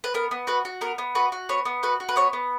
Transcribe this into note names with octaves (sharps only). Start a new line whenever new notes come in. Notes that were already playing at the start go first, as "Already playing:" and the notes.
B4
B3 A#4
B3
F#4 B4
F#4
B3 A#4
B3
F#4 B4
F#4
B3 C#5
B3
F#4 B4
F#4
B4
B3 C#5
B3